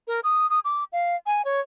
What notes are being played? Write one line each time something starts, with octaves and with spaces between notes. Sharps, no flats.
A#4
D#6
D#6
D6
F5
G#5
C#5